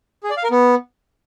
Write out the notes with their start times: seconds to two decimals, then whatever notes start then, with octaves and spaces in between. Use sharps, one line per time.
0.23 G#4
0.30 D5
0.37 F5
0.44 A#4
0.51 B3